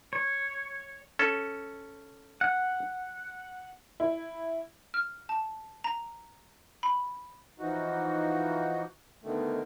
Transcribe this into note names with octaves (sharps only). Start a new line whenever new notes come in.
C#5
C#4 A4
F#5
E4
F6
A5
A#5
B5
E3 F3 D#4 F#4
B2 D3 D#3 A3